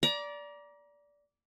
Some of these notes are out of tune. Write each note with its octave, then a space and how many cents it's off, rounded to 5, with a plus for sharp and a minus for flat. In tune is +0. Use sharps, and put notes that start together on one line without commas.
D5 -15 A#5 +30